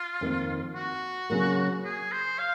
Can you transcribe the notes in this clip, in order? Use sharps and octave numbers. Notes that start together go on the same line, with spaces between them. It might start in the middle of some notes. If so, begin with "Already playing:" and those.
Already playing: F4
F2 D#3 A#3
F#4
C#3 F#3 A#3
G#4
C5
F5